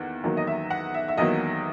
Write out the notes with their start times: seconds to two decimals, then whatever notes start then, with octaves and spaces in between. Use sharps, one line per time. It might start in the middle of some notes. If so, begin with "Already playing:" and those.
Already playing: E2 D#3 A#3 F#5
0.24 E2 D#3 F#3 A#3
0.37 D#5
0.47 E5
0.70 F#5
0.94 E5
1.08 E5
1.17 E2 D#3 F#3 A#3 D#5